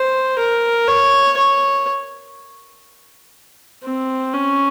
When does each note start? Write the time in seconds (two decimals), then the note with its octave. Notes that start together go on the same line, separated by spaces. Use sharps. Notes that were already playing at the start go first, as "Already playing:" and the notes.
Already playing: C5
0.39 A#4
0.88 C#5
1.37 C#5
3.84 C4
4.33 C#4